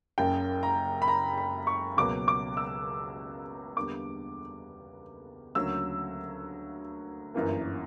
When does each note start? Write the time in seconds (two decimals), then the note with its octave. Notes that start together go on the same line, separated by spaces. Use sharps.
0.18 F#1 F#2 C#3 G5
0.63 A#5
1.02 B5
1.08 A#5
1.38 B5
1.67 C#6
1.97 C#2 B2 F#3 A#3 D6
2.28 D6
2.57 E6
3.76 E2 D3 G3 A#3 D6
5.55 D2 C#3 F#3 A#3 E6
7.34 G1 F#2 E3 A#3